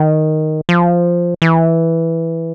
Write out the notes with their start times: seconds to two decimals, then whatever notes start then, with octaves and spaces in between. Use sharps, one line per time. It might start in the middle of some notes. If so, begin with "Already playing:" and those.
Already playing: D#3
0.69 F3
1.42 E3